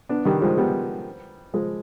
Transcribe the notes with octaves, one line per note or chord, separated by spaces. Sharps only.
B3 D4
D#3 G3
F3 G#3
G3 B3
F3 G#3